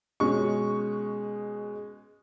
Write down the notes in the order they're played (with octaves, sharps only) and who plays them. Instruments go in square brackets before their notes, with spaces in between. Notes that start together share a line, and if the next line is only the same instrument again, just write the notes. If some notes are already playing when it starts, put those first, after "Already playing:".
[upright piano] B2 G#3 C#4 C#6